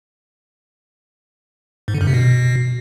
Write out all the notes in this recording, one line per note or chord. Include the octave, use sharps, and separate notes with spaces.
G#2
D3
F#2
C3
B2